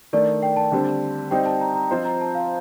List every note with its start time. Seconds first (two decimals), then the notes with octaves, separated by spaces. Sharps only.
0.13 D#3 A3 D4 D5
0.43 G5
0.56 A5
0.72 D3 G3 C4
1.31 G3 C4 D#4 G5
1.46 A5
1.61 A#5
1.75 A#5
1.90 F3 C4 F4 C5 D#5
2.05 A#5
2.21 A5
2.35 F5